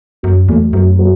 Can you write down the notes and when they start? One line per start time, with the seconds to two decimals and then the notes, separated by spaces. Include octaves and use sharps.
0.23 F#2 F#3
0.49 E2 A3
0.73 F#2 F#3
0.99 F#3